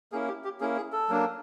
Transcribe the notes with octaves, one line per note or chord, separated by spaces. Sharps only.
A#3 C#4 E4 G#4
G4
G4
A#3 C#4 E4 G#4
G#4
A4
F#3 A#3 D4